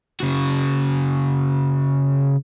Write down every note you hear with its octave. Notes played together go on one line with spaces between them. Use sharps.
C#3 F#4